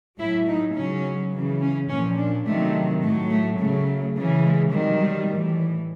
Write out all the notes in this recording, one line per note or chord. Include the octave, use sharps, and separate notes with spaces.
A2 F#3 E4
D#4
C#3 F#3 C#4
C#3 E3
C#4
A#2 F3 C#4
D4
C3 D#3 F#3 A3
A2 F#3 A3
A3
C#3 F#3 A3
C#3 E3
G#3
C3 D#3 F#3 G3
G3
A2 E3